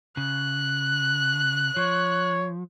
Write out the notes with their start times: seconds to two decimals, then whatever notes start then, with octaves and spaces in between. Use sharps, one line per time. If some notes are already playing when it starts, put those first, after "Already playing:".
0.17 C#3 F#6
1.77 F3 C#5